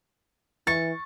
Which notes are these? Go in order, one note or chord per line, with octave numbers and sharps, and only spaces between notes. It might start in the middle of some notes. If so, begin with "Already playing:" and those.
E3 C#6 A6